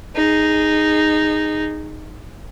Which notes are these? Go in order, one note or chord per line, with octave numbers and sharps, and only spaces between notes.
D#4 G#4